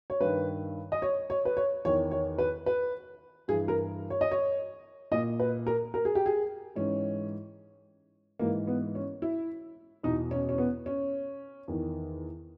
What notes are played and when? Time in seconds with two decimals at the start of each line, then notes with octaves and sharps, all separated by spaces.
0.10 C#5
0.21 G2 D#3 B4
0.92 D#5
1.02 C#5
1.30 C#5
1.45 B4
1.57 C#5
1.85 E2 D#3 C#5
2.11 C#5
2.38 B4
2.66 B4
3.48 G2 G#4
3.51 E3
3.68 A#4
4.10 C#5
4.21 D#5
4.31 C#5
5.12 A#2 D#5
5.40 B4
5.67 A#4
5.94 A#4
6.05 G#4
6.15 G4
6.26 G#4
6.76 G#2 E3 C#4
8.39 G#2 E3 A#3
8.67 B3
8.95 C#4
9.22 E4
10.03 E2 B2 D#4
10.31 C#4
10.49 C#4
10.58 B3
10.86 C#4
11.68 E2 D#3